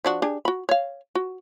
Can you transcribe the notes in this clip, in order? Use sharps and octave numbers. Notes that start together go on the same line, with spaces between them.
F3 D4 F#4
D4 G4 G#4
F#4 B5
C#5 F5
F#4